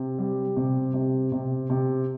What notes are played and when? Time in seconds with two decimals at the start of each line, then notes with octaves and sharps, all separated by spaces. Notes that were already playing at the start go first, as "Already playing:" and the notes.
Already playing: C3
0.18 G3
0.56 C3
0.94 C3
1.32 C3
1.70 C3